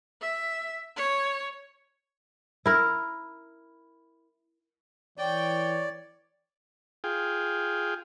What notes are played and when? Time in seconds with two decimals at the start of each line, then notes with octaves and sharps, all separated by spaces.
0.21 E5
0.96 C#5
2.66 E4 A#4
5.18 E3 C#5 D5 G5
7.04 F4 G#4 G5